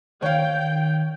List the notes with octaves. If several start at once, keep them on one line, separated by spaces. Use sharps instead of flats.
D#3 C#5 F5 G5